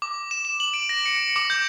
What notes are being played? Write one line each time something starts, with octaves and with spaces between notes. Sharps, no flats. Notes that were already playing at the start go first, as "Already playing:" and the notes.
D6
E7
E7
F#7
D7
A#6
C#7
D6
G6